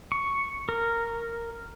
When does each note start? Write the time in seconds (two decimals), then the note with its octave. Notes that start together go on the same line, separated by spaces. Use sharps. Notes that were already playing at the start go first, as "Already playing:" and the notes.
0.12 C#6
0.69 A#4